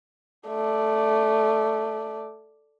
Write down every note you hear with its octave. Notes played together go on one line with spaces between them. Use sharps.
A3 D5